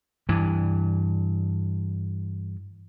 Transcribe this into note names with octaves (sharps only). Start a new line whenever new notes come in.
G2 E3